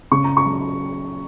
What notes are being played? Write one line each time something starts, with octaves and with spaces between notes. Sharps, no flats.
C#3 C#6
A#5
C#6
F#3